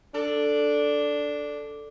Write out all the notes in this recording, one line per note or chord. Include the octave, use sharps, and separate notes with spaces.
D4 A4